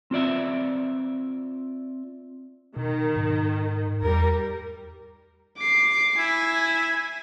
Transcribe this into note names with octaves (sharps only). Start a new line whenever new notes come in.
C4 F4 D5 E5
B2 D#3
G#2
E2 G3 A#4
D6 C7
E4 G#5